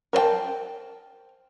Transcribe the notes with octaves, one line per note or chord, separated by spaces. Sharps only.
A#4 C5 C#5 G5 A5